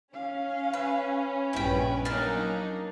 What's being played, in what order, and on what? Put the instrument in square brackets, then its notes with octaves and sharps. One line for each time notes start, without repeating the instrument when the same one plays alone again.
[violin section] C#4 [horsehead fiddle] F5
[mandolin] B4
[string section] A#1 G2 B4 [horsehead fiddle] B3 [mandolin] E4 G5
[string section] F#3 A#3 D#4 [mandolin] D4 F6